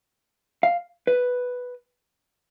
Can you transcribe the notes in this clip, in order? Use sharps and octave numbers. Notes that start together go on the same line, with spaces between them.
F5
B4